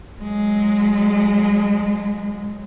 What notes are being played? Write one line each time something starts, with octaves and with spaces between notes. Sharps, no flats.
F#3 G#3